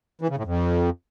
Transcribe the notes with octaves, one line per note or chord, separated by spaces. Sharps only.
E3
C#3
A2
F2